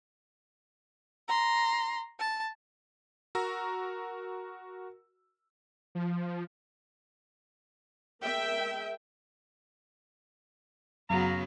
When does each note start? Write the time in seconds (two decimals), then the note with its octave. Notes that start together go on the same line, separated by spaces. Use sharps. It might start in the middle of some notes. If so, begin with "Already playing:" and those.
1.28 A#5 C6
2.20 A5
3.35 F#4 A#4 A#5 E6
5.95 F3
8.21 G#3 A#4 E5 G5
11.10 F#2 C#3 F#3 B3 F5 A#5